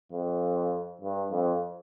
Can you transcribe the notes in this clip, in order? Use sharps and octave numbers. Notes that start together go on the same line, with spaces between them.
F2
G2
F2